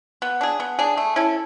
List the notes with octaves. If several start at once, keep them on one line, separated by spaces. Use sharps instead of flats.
B3
D4 G#4
B3
D4 G#4
A3
C#4 E4 A4